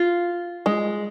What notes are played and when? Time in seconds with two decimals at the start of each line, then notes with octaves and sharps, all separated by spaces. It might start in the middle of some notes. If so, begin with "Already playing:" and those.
Already playing: F4
0.66 G#3